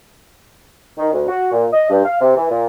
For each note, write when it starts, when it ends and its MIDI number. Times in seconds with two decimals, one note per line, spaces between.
0.98 1.10 51
1.12 1.28 38
1.28 1.47 66
1.52 1.66 46
1.73 1.89 75
1.90 2.04 43
2.05 2.16 77
2.21 2.37 48
2.37 2.49 52
2.50 2.66 46